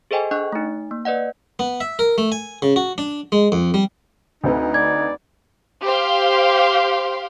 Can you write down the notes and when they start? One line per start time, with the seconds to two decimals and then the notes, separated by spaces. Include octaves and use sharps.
0.11 G#4 A4 C5 D#5 G5 G#5
0.31 D4 D#5 C#6 F#6
0.52 A3 D#4
0.91 A#3
1.05 B4 D5 D#5 F#5
1.59 B3
1.81 E5
1.99 A#4
2.18 A3
2.32 G#5
2.62 C#3
2.76 F#4
2.98 D4
3.32 G#3
3.52 F2
3.74 G3
4.44 D2 C4 D#4 B4
4.74 D5 G#6
5.82 G4 C5 F5 G5 C6